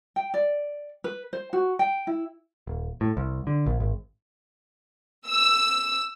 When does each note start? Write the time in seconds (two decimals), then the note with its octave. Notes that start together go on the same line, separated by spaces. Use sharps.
0.16 G5
0.34 D5
1.04 B4
1.33 C5
1.53 F#4
1.79 G5
2.07 E4
2.67 D#1
3.01 A2
3.17 C2
3.47 D3
3.66 A#1
3.80 G#1
5.27 E6